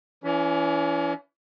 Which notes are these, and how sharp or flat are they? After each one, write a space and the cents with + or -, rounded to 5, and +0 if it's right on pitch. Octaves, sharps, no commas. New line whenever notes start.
E3 +20 C#4 +40